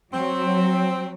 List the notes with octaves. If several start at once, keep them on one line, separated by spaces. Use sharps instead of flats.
F#3 C4